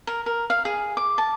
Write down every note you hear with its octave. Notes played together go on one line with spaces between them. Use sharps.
A#4
A#4
F5
G#4
D6
A5